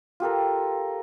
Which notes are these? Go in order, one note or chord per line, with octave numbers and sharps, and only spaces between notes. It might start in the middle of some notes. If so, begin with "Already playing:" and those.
F4 G4 A4 A#4